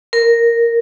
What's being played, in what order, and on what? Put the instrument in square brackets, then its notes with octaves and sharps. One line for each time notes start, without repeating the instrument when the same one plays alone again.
[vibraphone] A#4